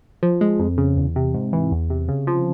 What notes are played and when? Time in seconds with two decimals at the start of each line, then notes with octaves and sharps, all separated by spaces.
0.23 F3
0.41 G#3
0.59 F2
0.78 C#3
0.97 E2
1.16 C3
1.34 G#2
1.53 E3
1.71 E2
1.90 C3
2.09 C#3
2.27 F3